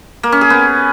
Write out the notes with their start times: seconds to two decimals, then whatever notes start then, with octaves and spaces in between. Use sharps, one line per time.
0.23 A#3
0.32 C#4
0.41 G#4
0.50 B3